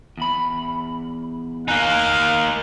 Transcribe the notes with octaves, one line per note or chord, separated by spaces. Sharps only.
E2 B5
A#3 D#4 F5 G#5 A#5 F#6